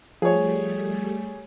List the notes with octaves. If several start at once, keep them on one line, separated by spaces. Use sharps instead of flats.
F3 G3 A3 G#4 C#5